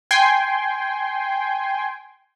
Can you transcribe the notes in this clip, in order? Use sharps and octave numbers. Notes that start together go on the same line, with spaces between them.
G5 G#5 C6